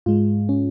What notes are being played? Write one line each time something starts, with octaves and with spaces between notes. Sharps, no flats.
G#2 G#3 F4
C#4